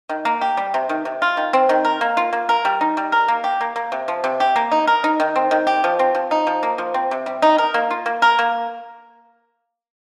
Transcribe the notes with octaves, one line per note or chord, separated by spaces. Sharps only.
D#3
A#3
G4
G3
C3
D#3
C3
F4
D#3
C4
D#3
A#4
A#3
F4
A#3
A#4
G3
D#4
G3
A#4
A#3
G4
A#3
A#3
C3
F3
C3
G4
A#3
D#4
A#4
D#4
D#3
C4
D#3
G4
F3
C4
F3
D#4
F3
A#3
F3
C4
C3
G3
D#4
A#4
A#3
F4
A#3
A#4
A#3